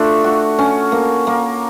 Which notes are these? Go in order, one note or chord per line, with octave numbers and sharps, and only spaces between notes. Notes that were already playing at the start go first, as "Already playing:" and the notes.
Already playing: A3 D4 F4
F#4
C#4
A#3
A#3